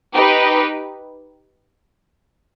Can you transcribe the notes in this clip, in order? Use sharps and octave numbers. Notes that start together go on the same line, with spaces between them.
D#4 G4 B4